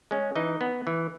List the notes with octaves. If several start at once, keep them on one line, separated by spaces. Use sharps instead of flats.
G#3 C#4
E3 D#4 D#5
B3
E3